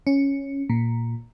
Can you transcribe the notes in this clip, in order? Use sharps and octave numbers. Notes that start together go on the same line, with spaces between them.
C#4
A#2